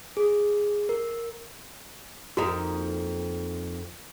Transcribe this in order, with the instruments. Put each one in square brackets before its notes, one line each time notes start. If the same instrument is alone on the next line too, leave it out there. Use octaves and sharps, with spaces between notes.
[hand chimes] G#4
A#4
[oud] F2 A#3 D#4 [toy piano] F#4